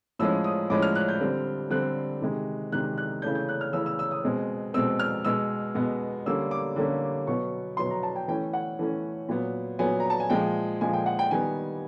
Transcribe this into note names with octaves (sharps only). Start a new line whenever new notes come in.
A2 F3 G#3 C#4 E6
D#6
A2 F3 G#3 C#4 D6
F6
F#6
G6
D3 G3 C4
D3 G3 C4 F#6
C3 D#3 G#3
C3 D#3 G#3 F#6
F#6
C#3 E3 A3 C#4 G6
G6
F#6
F6
C#3 E3 A3 C#4 E6
E6
E6
D#6
B2 G#3 C4
B2 G#3 C4 E6
F6
B2 G#3 B3 E6
B2 G#3 B3
D3 G3 A#3 C#4 E6
D6
D3 G3 A#3 C#4
B2 F#3 B3 C#6
B2 F#3 B3 C6
A#5
A5
G5
E3 A3 C#4 G5
F#5
E3 A3 C#4
A#2 F#3 B3
A#2 F#3 B3 G#5
A#5
A5
G#5
A#2 F3 G#3 G5
A#2 F3 G#3 G#5
G5
F#5
G5
D#3 G3 B3 G#5